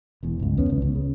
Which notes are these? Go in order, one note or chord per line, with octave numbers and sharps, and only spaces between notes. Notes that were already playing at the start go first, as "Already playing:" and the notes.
E1 E2
G1 C#2
D#2 B3 C#4
C#2
C#2
C#3